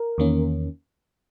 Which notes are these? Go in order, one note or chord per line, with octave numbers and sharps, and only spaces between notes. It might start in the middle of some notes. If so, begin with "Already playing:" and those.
Already playing: A#4
E2 D#3 A#3 C#4